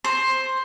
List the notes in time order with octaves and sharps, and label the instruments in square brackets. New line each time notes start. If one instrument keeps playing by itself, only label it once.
[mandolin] C5